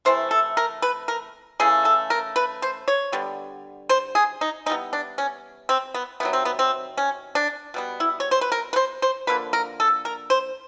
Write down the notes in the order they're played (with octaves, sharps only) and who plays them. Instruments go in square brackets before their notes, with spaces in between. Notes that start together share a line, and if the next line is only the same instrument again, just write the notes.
[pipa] C3 E3 A3 C5
A4
A#4
B4
A#4
C#3 E3 A3 G#4
A4
A#4
B4
C5
C#5
D3 G3 B3
C5
G#4
D#4
E3 D#4
G3 B3
D4
C#4
C4
B3
C3 D#3 F#3 B3
C4
B3
C4
C#4
D4
B2 G3 B3
E4
C#5
C5
B4
A#4
B4
C5
C5
D3 F3 A#3 B4
A#4
A4
A#4
C5